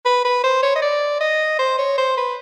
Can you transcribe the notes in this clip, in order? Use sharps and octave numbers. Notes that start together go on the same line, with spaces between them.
B4
B4
C5
C#5
D#5
D5
D#5
C5
C#5
C5
B4